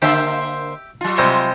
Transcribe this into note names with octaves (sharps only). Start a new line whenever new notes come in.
D3 A#3 G4 C5 E5
F#3 F4
C3 G3 G#3